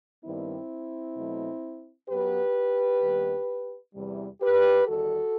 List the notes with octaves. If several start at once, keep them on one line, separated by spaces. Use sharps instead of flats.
G2 D#3 G3 B3 C4 E4
B2 F#3 A3
F#2 F#3 B3 G4 B4
D#2 D#3 G3 B3
E2 C3 E3 G3
G4 B4
E2 D#3 G3 F#4 A4